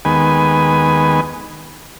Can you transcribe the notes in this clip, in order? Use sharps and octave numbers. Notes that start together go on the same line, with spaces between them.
D#2 D#3 G#3 B3 B4 G#5